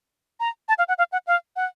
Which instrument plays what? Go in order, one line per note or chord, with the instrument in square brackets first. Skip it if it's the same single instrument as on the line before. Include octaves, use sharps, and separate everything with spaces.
[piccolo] A#5
A5
F5
F#5
F5
F#5
F5
F#5